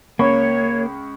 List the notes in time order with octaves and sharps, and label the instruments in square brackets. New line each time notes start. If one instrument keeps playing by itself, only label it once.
[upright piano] C#2 B5 C#6 [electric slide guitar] A#3 [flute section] C#5